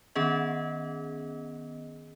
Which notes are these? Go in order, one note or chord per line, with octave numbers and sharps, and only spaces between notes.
D#3 B3 C#4 G#4 D#5